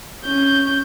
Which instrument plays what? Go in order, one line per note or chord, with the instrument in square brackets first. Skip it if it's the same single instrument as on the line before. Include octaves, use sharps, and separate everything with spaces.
[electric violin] C#4 G6